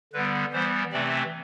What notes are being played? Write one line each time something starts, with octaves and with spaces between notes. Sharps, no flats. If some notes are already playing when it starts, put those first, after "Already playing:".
D3 G3 B3 B4
E3 G3 B3 C5
C3 E3 A3 C4 D5